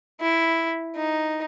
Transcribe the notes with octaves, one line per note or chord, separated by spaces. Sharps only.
E4
D#4